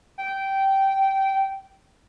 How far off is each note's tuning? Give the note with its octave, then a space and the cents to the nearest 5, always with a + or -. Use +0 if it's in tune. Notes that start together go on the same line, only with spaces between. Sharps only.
G5 -15